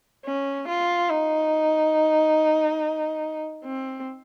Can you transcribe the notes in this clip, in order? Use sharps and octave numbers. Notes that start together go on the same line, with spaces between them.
C#4
F4
D#4
C4